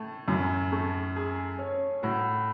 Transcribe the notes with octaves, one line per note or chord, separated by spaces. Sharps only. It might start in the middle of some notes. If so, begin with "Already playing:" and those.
Already playing: A2 A3
F#2 A2
A3
G#4
C#4
A2 F#4